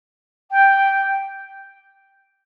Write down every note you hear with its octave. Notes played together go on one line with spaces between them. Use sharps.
G5